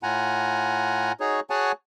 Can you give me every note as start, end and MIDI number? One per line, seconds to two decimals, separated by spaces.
0.03 1.12 45
0.03 1.12 65
0.03 1.12 78
0.03 1.12 80
0.03 1.12 82
1.20 1.40 63
1.20 1.40 66
1.20 1.40 68
1.20 1.40 73
1.50 1.72 66
1.50 1.72 68
1.50 1.72 73
1.50 1.72 78
1.50 1.72 80
1.50 1.72 81